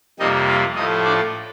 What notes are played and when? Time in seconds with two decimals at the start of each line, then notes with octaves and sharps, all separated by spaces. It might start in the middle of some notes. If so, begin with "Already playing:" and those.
0.19 F2 C3 G3 A#3 D#4 D#5
0.47 F4 F5
0.75 A2 F3 A3 D#4 D#5
1.04 D4 D5